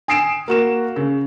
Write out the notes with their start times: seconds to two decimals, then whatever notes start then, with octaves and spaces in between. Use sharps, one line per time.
0.08 G#5 D#6 C7 D7 E7
0.48 A#3 F#4 E7
0.96 C#3